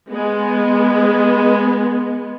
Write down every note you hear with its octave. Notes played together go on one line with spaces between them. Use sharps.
G#3 B3